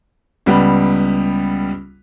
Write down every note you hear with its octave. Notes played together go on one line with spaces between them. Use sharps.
C#2 G3 B3